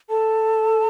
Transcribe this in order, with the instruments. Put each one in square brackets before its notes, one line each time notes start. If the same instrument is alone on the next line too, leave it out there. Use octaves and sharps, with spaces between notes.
[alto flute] A4 [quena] A5